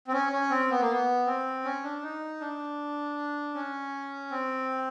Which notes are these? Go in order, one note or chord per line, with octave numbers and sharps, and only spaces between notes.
C4
C#4
C#4
C4
B3
A#3
B3
C4
C#4
D4
D#4
D4
C#4
C4